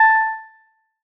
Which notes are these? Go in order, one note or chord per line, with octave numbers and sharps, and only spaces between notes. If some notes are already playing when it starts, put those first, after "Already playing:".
Already playing: A5